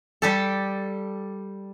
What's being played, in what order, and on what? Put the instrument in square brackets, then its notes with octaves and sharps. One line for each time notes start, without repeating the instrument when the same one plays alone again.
[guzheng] G3 G4 A4